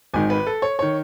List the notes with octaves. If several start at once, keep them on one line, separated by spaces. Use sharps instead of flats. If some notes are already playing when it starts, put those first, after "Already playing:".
G#1 G#2 D#3 G#5
B4
A4
C#5
D#3 C#5